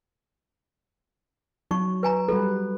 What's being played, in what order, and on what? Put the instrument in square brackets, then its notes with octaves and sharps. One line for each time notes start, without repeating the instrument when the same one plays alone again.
[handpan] F#3 [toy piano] D#4 C#6
[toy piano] B4 G#5 A#5
[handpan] G3 F#4 B4 [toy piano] A4